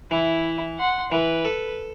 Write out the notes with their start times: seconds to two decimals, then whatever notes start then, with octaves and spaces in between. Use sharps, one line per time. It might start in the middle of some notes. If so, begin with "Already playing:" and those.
0.11 E3 E4
0.79 F#5 C6
1.12 E3 B4
1.45 A4